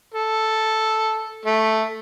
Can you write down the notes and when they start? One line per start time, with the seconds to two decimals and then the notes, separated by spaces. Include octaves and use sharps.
0.14 A4
1.45 A3